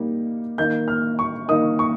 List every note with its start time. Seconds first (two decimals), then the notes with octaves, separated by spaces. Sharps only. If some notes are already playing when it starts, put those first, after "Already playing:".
Already playing: G3 A#3 D#4
0.58 D#3 A#3 D#4 G6
0.88 F6
1.19 C#6
1.48 D#3 A#3 D#4 D#6
1.79 C#6